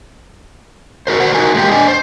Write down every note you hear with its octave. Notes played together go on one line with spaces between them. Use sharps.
F#4 A#4 C5
F#4 C5 F#5
D#4 F#4 A#4 G#5
G#3 A#3 E4 G4
D4 D#5 G#5
C5